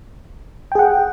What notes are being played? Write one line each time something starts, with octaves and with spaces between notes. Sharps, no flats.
G#4 F#5 G5